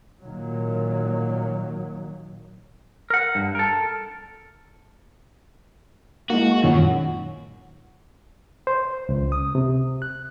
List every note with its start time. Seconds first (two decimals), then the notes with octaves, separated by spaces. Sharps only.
0.23 A#2 D#3 F#3
3.10 A#4 F#5
3.35 G2
3.55 A4 A#4
6.30 G#3 A#3 D#4 E4 F#4
6.51 C#6
6.64 F#2 A#2 D#3 C#5 F#5
8.67 C5
9.09 C#2
9.32 D#6
9.55 C3
10.02 F#6